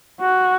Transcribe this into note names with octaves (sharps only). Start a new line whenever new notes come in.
F#4